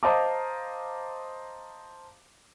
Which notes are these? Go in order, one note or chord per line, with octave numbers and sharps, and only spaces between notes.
C5 D#5 F5 A5 A#5 D6